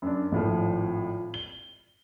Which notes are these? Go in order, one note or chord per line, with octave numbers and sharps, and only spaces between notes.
F#2 D4
G#1 A2 F3
G7